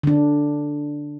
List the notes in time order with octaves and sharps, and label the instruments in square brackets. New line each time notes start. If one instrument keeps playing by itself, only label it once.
[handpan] D3 D4